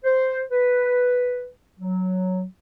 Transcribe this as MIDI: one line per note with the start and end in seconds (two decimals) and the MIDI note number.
0.04 0.42 72
0.52 1.47 71
1.80 2.44 54